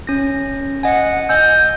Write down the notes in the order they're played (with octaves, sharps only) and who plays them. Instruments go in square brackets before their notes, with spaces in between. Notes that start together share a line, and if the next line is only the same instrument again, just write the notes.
[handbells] C#4 A#6
[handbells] D#5 G#5 [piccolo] F#5
[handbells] D#5 G#5 E6 [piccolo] G6